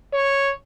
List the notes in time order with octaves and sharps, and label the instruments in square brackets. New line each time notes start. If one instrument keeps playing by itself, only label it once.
[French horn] C#5